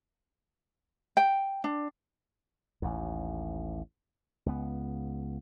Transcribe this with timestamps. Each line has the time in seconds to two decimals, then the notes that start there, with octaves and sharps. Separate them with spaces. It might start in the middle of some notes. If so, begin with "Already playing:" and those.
1.17 G5
1.64 D4
2.82 A1 D#2
4.46 C#2 B3